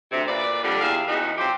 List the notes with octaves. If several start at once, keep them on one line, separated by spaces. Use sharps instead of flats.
D2 C3
A#2 B4 D5
F2 D3 G3 D4
E2 G4 G#4 E5 F5
E2 C#4 D#4 F#4 B4
F#3 C4 F4 G4